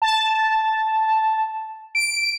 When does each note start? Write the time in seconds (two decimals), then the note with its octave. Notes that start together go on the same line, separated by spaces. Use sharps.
0.02 A5
1.95 D7